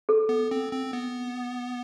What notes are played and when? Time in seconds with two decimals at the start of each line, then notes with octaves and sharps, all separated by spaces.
0.09 A4
0.29 B3
0.51 C4
0.72 C4
0.93 B3